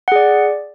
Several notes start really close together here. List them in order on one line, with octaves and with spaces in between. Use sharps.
F#5 G#4 D5